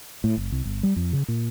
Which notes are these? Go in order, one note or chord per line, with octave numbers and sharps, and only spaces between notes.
A2
F#1
C2
G1
G3
F2
C#3
A#2